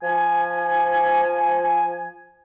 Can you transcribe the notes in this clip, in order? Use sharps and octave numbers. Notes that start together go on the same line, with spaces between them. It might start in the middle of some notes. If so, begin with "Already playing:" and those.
F3 G#5